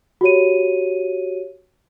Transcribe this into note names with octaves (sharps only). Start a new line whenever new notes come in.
F#4 G4 C#5 D#7